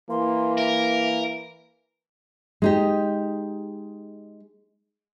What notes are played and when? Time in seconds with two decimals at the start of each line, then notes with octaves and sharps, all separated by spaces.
0.10 E3 A#3 C6
0.57 A#4 E5
2.62 G#3 D#4 G4